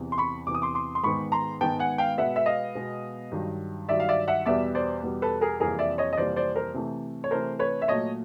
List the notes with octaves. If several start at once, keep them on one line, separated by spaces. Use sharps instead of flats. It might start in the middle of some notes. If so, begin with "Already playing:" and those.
Already playing: E2 C3 E3
C6
B5 C#6
E2 C3 E3 D6
D#6
C6 D6
C6 D6
C6
G#2 D#3 G#3 B3 B5 C#6
A#5 C6
G#2 D#3 G#3 B3 G5 A5
F#5 G#5
F5 G5
B2 G#3 B3 E5 F#5
E5
D#5 F5
B2 G#3 B3
G2 D#3 F#3
G2 D#3 F#3 D5 E5
F5
D5 E5
E5 F#5
E2 B2 G3 B3 D5 E5
C5 D5
E2 B2 G3 B3
A4 B4
G#4 A#4
F2 C3 E3 G3 A#3 G#4 A#4
D5 E5
C#5 D#5
D#5
F2 C3 E3 G3 A#3 C5 D5
C5 D5
A#4 C5
C3 E3 A3
C#5
C3 E3 A3 A#4 C5
B4 C#5
E5
A#2 F#3 A3 C#5 D#5